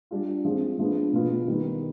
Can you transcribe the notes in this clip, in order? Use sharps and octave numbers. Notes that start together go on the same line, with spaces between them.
G3 D4 F4
F3 G#3 C4
D3 F3 G#3 B3 D4
B2 B3 F4
D#3 G3 B3